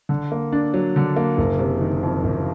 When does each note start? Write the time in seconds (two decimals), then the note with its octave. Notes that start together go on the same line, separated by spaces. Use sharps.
0.09 D3
0.32 A#3
0.53 D4
0.74 F#3
0.96 D3
1.16 A#3
1.38 F#1
1.59 C3
1.81 D#3
2.03 F2
2.24 F#1